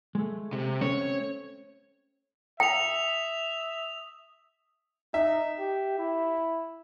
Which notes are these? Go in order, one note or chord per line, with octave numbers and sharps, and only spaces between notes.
G#3 A3
C3
A3 C4 C#4 C#5
E5 G5 D#6 F7
D#4 E5
G4
E4